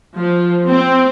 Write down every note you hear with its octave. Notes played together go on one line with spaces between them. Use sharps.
F3
C4